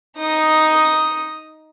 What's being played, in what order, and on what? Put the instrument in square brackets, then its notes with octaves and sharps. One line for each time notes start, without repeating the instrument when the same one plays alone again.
[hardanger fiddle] D#4 D#6